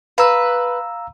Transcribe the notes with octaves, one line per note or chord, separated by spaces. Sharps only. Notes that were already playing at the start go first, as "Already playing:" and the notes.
B4 F5 A#5 E6